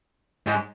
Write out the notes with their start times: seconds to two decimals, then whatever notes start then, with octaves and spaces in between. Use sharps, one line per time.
0.47 G#2